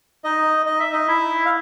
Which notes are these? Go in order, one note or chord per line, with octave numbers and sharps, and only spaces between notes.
D#4 D#5
D#5
E5
D#4 D#5
E4 E5
F5